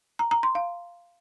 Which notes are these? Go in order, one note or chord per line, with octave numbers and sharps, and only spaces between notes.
A#5
A#5
C6
F5